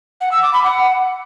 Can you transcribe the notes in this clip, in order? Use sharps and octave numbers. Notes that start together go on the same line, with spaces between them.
F#5
E6
D6
B5
F#5